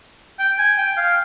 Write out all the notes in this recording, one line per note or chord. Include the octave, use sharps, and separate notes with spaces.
G5
G#5
G5
F5